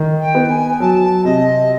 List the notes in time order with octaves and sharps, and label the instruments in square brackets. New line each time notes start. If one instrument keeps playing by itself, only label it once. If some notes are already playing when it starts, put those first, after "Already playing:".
Already playing: [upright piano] D#3
[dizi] G5
[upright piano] B3
[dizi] G#5
[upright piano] F#3 [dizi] A5
[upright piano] C3 [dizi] D#5